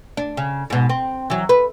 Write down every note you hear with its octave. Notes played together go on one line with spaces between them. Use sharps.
D4
C#3
G#2 B2
C4
E3 F#3
B4